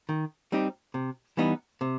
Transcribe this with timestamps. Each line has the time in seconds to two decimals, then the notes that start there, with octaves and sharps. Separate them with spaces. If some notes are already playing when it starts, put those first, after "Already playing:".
0.09 D#3
0.52 G3 C4 D#4 G4
0.94 C3
1.37 E3 G3 B3 D#4
1.81 C3